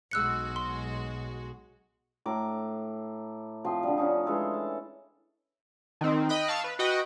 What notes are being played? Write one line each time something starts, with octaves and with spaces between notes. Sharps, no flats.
B1 G#3 F#4 E6 F#6 C#7
C6
A2 A#5 D6
F3 C4 D#5 C6
D3 G3
F3 C#4 D#4
E3 G#3 A4
A5
D#3 C4
D#5 G5 B5 F#6
F5 A5 C#6 E6
B4
F#4 B4 D#5 F#5 G5